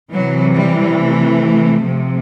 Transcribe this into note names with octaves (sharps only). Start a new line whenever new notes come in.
C3 E3 F#3
G3
A3
C3 F3